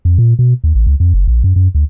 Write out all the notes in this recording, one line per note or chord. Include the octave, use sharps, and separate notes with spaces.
F2
A#2
B2
D#2
A1
C#2
F2
F#1
A#1
F#2
F#2
D2